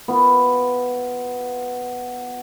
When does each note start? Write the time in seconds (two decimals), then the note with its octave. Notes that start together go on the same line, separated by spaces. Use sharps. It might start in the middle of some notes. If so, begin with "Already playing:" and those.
0.08 B3 F4